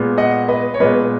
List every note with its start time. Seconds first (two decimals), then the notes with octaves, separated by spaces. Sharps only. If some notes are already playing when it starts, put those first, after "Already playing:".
Already playing: A#2 G#3 B3
0.18 D#5 F#5
0.48 B4 D#5
0.74 C#5
0.80 A#2 G#3 B3 B4 D#5